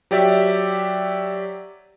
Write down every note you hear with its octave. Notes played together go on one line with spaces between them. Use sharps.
F#3 G4 D5 E5